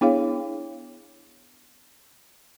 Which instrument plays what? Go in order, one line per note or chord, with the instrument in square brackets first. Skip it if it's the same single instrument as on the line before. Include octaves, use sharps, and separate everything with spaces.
[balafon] B3 D4 E4 G#4 C#5 F5